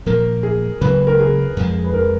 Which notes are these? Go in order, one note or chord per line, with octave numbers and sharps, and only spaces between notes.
A#2 F3 A#3 A#4
G#4
C#2 C#3 F#3 A#3 B4
A#4
G#4
F2 F3 G#3
B4
A#4